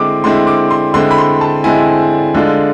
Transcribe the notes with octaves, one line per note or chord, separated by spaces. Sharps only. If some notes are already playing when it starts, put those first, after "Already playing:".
Already playing: D3 G#3 C4 E4 D6
D3 G#3 C4 E4 C6
D6
C6
D3 G#3 C4 E4 C6
B5
C6
A5
D3 G#3 C4 E4 G#5
D3 G#3 D4 F4